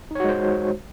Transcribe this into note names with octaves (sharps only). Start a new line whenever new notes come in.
G#3 D#4 F#4 C5 C#5